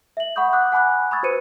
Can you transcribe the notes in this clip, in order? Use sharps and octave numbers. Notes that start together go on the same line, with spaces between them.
E5 F#7
F#5 B5 C#6 D#6 G6
F#5 D6 D#6 F#6
F#5 G#5 B5 D6 F#6
B5 C#6 D#6 E6 G#6 A6
F#4 B4 C5 C#7 D#7